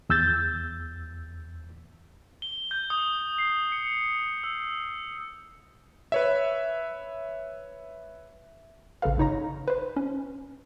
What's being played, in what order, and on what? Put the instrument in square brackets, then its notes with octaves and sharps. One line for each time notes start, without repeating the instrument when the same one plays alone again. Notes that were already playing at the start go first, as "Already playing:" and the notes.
[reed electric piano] E2 E6 G6 A6
[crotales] G7
G6
D#6
C7
C#7
E6
[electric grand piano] B4 C#5 E5
[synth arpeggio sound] A1 C#3 A4 B4 F5
G1 C#3 D#4 C#5 A#5
B4 C5
C#4